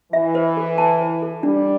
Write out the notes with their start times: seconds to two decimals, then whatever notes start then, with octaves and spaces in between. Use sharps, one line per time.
0.13 E3 E5
0.35 C5
0.57 A4
0.78 A5
1.00 C5
1.22 A4
1.43 G3 D4